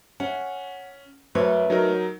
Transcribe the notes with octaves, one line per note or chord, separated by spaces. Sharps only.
C#4 F#5
F#2 A3 B4 C#5
F#3 D#4 A#4